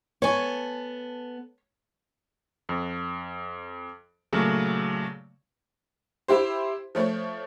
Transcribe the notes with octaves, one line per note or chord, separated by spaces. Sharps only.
B3 A4 C#5 G#5
F2
A#2 C#3 F#3 A3
E4 G4 C5
F3 A3 C#5